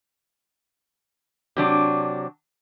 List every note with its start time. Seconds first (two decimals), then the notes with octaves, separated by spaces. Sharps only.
1.57 C3 F#3 D4